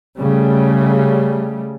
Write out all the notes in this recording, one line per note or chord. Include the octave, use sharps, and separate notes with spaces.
C#3 G3 A3